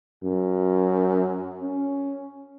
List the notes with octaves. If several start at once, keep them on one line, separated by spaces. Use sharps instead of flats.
F#2
C#4